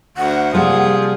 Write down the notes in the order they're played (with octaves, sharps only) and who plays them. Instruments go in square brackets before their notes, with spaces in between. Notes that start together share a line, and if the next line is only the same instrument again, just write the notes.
[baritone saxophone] D2 [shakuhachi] F#5
[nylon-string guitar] C3 G3 A#3 [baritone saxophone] F3 [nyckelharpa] G#4